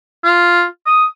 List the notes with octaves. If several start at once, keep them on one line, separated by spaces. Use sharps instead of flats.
F4
D#6